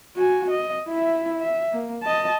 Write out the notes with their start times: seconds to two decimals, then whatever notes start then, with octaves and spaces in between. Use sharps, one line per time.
0.16 F#4 G#5
0.50 D#5
0.88 E4 E5
1.40 E5
1.72 A#3
2.03 D#5 A5